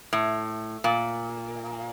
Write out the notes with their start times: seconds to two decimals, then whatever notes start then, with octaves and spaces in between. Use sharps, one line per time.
0.13 A2
0.84 A#2